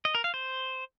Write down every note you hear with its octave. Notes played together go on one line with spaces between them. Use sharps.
D#5
A#4
F5
C5